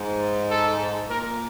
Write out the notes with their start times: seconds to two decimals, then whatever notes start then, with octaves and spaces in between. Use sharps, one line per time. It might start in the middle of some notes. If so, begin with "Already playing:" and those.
Already playing: G#2
0.50 A4
1.09 A#2 A#4